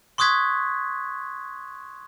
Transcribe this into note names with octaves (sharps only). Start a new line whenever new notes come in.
C6 C#6 D#6 F#6 G#6 B6